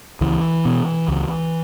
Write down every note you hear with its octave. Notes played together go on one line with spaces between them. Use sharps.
C#2 E3
B2
C#2